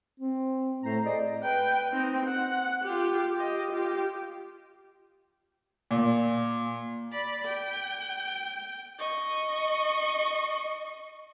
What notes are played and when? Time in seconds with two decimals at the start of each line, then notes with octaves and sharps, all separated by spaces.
0.20 C4
0.84 A2 A3 C5 A#5
1.05 G#4 C5 D5 D#5
1.43 B4 G5
1.92 C4 D#4
2.26 F#5
2.84 F4 G4
3.35 G4 D#5
3.71 F4 G4
5.91 A#2
7.12 D5 B5
7.45 G5
8.99 D#5 C#6